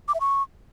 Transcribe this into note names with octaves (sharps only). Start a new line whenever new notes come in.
D6
E5
C#6